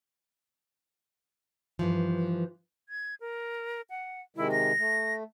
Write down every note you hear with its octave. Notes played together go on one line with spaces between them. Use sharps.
G2 E3 F3
G#6
A#4
F#5
C3 D#3 G#3 E4
A#6
A3